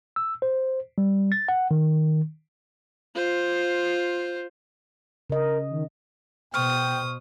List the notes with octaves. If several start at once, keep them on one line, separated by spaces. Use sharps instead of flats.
E6
C5
G3
A6
F#5
D#3
F4 C5
C#3 A#4 D#5
D#3
B2 C5 G5 C#6 D#6 F6